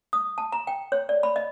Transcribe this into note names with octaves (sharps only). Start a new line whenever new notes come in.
D#6
A5
A#5
G5
C#5
D5
B5
D#5